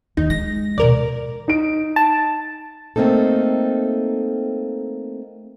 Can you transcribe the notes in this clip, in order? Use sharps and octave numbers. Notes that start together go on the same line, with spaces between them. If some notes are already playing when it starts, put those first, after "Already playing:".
D#2 D#4
G#3 A#6
D#2 B2 A#4 D5
D#4 D7
A5
A3 A#3 C4 D#4 A4